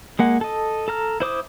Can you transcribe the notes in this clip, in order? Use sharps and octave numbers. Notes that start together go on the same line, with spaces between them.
G#3 A#3 F#5
A4 D#5
A4 A#5 F6
E4 C5 D6 D#6